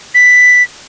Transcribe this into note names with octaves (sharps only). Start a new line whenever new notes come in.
B6